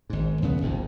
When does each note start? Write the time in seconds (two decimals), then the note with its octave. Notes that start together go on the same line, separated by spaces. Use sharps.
0.10 G#1 G#2
0.42 D#2 C#3 B3
0.61 D#1 G#1 D#2 A#2